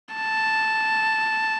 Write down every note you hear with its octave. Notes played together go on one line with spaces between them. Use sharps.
A5